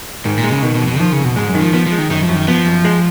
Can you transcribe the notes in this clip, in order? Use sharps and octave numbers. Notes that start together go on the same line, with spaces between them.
G#2 D#3
A#2
G#3
C#3
B2 D#3
B2
F2
B2
D#3 F3
C#3
F2
B2
G#2 G#3
F#2
D#3
F3
F3 B3
F3
G#3
D#3
F#2 D#3
F3
F#2
D#3
F3 B3
F#2
G#3